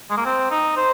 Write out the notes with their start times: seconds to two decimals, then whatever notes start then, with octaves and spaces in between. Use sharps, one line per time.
0.10 G#3
0.17 A#3
0.25 C4
0.51 D#4
0.77 C5